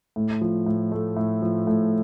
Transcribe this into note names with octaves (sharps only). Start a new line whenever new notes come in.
A2
F3
A2
A3
A2
F3
A2